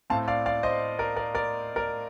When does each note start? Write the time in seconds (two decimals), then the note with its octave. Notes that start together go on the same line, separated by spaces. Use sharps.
0.10 A2 A3 C4 F5 A5
0.28 D5 F5
0.46 D5 F5
0.63 C5 D#5
0.99 A#4 D5
1.16 A#4 D5
1.35 A#4 D5
1.76 A#4 D5